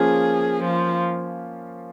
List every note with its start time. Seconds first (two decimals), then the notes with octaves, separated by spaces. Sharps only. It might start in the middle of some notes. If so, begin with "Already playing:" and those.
Already playing: F3 A#3 C#4 F4 G#4
0.64 F3